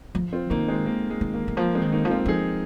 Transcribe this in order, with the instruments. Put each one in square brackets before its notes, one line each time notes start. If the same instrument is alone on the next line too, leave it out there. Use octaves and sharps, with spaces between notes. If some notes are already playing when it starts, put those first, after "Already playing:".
[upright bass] F3
[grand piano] C4 F4
[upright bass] D#3 [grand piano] A#3 D#4
[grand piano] G#3 C4
A#3
G#3
[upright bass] D#3
[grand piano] A#3
[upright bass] D#3
[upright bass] F3 [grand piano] A#3
[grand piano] G#3 C4
[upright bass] D#3
[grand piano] A#3 D#4
[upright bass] F3
[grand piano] C4 F4
[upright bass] F3 [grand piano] D#4 G#4